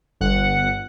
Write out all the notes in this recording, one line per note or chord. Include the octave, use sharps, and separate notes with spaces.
G1 F#5